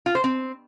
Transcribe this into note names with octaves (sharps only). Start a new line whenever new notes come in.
F4
C5
C4